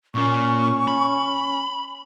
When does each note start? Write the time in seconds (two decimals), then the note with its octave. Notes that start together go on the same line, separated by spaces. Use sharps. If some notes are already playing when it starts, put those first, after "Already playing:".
0.15 A#2 A#3 C#4 C#6
0.88 B5